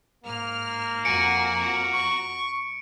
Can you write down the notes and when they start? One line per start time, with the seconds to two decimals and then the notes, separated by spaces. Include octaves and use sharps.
0.24 G#2 A#3 F6
1.05 F2 F#4 G#5 A#5 C#7 D7
1.93 C#6